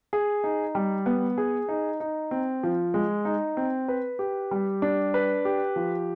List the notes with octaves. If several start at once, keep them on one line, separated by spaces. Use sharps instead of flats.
G#4
D#4
G3
B3
G#4
D#4
D#4
C4
F3
G#3
D#4
C4
B4
G4
G3
D4
B4
G4
F3